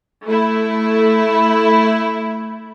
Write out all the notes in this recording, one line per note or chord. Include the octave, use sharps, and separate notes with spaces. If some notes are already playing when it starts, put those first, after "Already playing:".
A3 E4